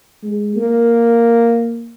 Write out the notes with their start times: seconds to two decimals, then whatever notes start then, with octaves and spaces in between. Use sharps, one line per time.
0.23 G#3
0.56 A#3